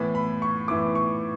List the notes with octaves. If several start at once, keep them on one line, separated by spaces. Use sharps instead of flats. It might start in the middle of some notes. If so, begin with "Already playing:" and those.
Already playing: A2 E3 B3 B5
B5
C#6
A2 E3 B3 D6
C#6